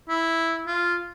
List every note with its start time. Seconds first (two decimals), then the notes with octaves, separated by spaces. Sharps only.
0.09 E4
0.67 F4